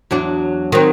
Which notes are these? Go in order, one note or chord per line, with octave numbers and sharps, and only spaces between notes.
E2 F#3 D4
D#3 F#3 C4